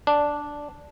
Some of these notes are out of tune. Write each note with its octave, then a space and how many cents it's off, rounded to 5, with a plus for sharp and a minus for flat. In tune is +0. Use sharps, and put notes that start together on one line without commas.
D4 -5